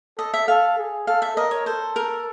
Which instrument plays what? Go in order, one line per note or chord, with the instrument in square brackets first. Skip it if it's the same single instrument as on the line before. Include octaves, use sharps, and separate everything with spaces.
[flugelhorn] A4 [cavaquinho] D#5
[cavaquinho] E5
[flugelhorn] A4 [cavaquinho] F5
[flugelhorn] G#4
[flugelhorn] A4 [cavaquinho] F5
[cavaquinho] E5
[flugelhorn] A#4 [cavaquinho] D#5
[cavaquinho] C#5
[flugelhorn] A4 [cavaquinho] C5
[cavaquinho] A#4